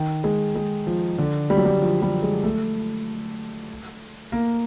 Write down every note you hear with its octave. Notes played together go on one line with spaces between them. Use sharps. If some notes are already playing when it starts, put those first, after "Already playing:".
Already playing: D#3
G#3
G#3
F3
D3
G3
F#3
G3
F3
G3
G#3
A3
A#3